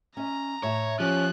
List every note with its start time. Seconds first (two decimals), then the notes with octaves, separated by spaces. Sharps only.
0.17 C#4 D#5 A#5
0.63 A2 C#5 E5 A5
1.00 F3 C#4 G4 F#6